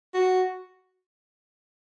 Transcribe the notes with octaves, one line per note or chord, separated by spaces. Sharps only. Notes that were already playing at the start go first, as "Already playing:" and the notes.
F#4